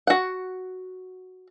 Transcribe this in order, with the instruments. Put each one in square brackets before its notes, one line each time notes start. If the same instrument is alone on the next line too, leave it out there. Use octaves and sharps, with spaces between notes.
[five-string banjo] F#4 F#5